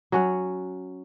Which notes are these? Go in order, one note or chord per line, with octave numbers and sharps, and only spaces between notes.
F#3 C#4 F#5